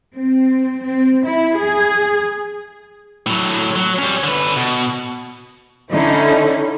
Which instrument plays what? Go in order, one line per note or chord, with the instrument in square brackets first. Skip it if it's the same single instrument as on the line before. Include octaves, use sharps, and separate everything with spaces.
[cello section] C4
C4
E4
G#4
[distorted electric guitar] A2 F#3
F#3
G3 C#4
D3 B4
B2
[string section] D3 C#4 D#4 E4